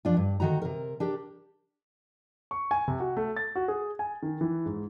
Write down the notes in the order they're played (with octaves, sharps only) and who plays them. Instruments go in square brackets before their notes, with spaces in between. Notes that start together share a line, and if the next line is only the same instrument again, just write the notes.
[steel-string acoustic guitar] F3 D4 F4
G2
D2 C3 D#3 F#4 A#5
C3 A#4
D4 G4 A#4
[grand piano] C#6
G#5
C3
F#4
A3
A6
F#4
G#4
G#5
D#3
E3
G#2